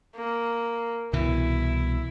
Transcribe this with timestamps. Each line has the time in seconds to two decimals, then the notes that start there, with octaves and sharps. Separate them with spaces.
0.15 A#3
1.13 C2 B2 E3 E4